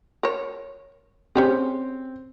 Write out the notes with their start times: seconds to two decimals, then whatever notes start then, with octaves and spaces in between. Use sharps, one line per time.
0.23 A#4 C#5
1.35 C4 C#4 G4 G#4